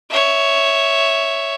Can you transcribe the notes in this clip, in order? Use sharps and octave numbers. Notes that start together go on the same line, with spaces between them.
C#5 E5